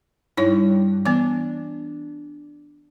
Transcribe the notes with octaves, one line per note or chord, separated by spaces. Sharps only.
G2 D#4 E4 C#5
E3 B3 D4